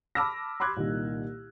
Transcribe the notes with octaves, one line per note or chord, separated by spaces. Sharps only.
A5 B5 D6 E6 F6 A#6
B5 C6 D6 F#6 G#6
C2 A#2 D#3